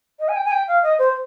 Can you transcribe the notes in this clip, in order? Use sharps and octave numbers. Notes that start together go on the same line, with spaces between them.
D#5
G#5
G5
G#5
G5
F5
D#5
C5